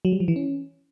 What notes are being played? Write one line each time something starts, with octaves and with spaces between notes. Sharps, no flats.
F#3
G3
F3
E3
C#4